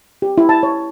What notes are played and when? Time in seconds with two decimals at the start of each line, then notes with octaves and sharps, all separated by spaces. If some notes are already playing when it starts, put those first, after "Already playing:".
0.22 G4
0.38 E4
0.49 A5
0.63 C#5